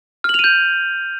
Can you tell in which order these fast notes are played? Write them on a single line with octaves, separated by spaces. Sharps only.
F6 F#7 F7 D#7 G6